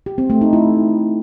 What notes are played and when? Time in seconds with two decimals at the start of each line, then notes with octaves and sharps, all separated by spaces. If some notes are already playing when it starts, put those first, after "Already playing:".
0.06 G4
0.18 C4
0.30 A3
0.41 D#4
0.53 E4